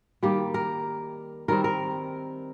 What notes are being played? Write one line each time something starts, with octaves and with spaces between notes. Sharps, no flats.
D#3 G3 A#3 G4
A#4
D#3 G3 C4 A#4
A#4